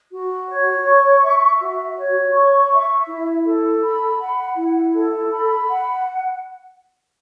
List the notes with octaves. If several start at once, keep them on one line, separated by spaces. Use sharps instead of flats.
F#4
C#5
C#6
E5
F#4
C#5
C#6
E5
E4
A4
B5
F#5
E4
A4
B5
F#5